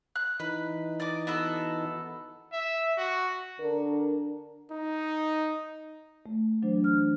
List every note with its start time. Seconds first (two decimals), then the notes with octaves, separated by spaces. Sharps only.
0.16 F#6
0.40 E3 D#4 B4
1.00 D5 D#5 D6
1.27 B3 F#4 A4
2.52 E5
2.97 F#4
3.59 D3 D4 A#4
4.72 D#4
6.26 A3
6.62 E3 F#3 D4 C5
6.84 F6